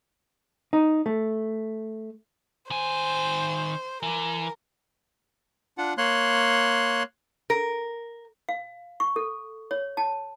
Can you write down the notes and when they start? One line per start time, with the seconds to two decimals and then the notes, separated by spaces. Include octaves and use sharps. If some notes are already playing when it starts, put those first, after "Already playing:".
0.73 D#4
1.06 A3
2.70 D#3 C5 G#5
4.03 E3 A#4
5.78 D4 F4 F#5
5.98 A#3 C#5 C6 F#6
7.50 A#4
8.49 F5
9.00 C#6
9.16 A4
9.71 C#5
9.97 A5